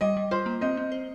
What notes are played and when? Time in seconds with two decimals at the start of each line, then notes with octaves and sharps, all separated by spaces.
0.01 G3 D#5
0.17 G3
0.31 F4 C5
0.46 A#3
0.61 C4 D#5
0.77 C4
0.92 C5